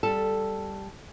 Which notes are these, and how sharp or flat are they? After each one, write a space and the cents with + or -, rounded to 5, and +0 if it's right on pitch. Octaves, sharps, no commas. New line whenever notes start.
G3 +0 A4 +0